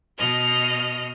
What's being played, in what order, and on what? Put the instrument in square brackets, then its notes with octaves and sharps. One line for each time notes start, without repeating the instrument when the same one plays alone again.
[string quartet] B2 D#5 F6